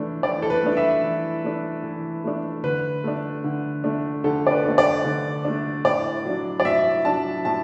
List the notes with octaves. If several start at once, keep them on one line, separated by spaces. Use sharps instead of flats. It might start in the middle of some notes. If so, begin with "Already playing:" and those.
Already playing: E3 A3 D4
E3 D5
A4
B4
A3 D4
E5
E3
A3 D4
E3
A3 D4
D3 B4
A3 D4
D3
A3 D4
D3 A4
D5
B4
A3 D4
D5
D3
A3 D4
A2 D5
F#3 D4
D5
A2 E5
F#3 D4 A5
A2 A5